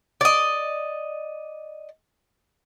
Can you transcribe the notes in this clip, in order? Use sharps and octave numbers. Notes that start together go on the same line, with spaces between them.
D5 D#5